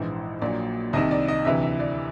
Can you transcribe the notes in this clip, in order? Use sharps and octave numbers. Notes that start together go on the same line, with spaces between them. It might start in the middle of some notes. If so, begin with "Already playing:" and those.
Already playing: A#1 G#2 E3 C5
A#1 A#2 F#3 D5
C2 C3 D#3 D#5
D5
D#5
D2 C3 E3 E5
E5
D5